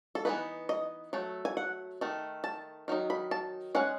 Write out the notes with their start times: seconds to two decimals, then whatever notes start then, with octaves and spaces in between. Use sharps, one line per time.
0.15 A4
0.25 E3 B3 D#4 B4
0.69 D#5
1.13 F#3 A3
1.45 G#5
1.57 F#5
2.01 D#3 A3
2.44 A5
2.88 D#3 F#3 D#4
3.10 B5
3.31 A5
3.75 G#3 C#4 F#5